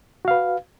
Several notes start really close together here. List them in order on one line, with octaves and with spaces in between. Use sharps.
F#4 F5 B4